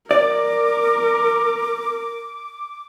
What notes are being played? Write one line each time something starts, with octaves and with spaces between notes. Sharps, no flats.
A#4 D5 D6